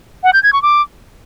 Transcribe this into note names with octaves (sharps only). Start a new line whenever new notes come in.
F#5
G6
G#6
C#6
D6